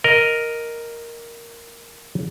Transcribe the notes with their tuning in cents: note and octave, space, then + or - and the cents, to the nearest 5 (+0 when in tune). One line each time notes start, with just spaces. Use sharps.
A#4 +0 D#5 +0